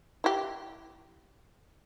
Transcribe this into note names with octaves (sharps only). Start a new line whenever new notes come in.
E4 G4